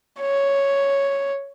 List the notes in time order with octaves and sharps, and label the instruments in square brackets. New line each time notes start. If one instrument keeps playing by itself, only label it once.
[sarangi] C#5